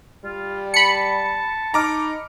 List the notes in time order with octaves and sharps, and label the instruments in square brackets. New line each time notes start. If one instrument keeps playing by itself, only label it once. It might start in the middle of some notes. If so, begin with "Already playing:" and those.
[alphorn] G3 [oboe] F4
[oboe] A5 [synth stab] B5 C#7
[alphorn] D#4 [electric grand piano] A#5 D6 F6